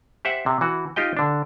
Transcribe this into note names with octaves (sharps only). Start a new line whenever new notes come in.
G4 C5 E5 F#5
C3
E3 F#4
D#4 F4 G4 D#5 G5
D3 D4